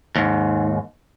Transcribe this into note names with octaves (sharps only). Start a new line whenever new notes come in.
D#2 G#2